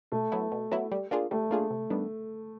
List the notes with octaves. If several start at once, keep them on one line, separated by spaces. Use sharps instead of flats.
B2 A3
F#3 B3 E4
B2
F#3 B3 E4
G3
A#3 D4 F4 G#4
G3 A3
A#3 D4 F4 G#4
C3
D#3 G3 B3 D4